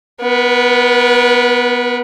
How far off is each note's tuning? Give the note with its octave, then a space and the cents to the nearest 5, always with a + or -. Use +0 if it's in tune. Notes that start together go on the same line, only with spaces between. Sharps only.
B3 +0 A#4 +45